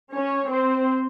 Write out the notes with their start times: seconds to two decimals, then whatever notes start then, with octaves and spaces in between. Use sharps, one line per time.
0.13 C#4 C#5
0.49 C4 C5